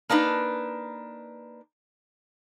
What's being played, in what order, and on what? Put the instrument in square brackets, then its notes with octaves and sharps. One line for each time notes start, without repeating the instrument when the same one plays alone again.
[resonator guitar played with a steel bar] A#3 D4 D#4 B4